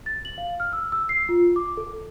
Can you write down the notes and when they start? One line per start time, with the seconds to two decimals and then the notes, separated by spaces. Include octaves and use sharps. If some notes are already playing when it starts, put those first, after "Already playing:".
0.06 A6
0.25 F#7
0.38 F5
0.60 F6
0.73 E6
0.92 E6
1.09 C7
1.29 F4
1.56 D6
1.77 A4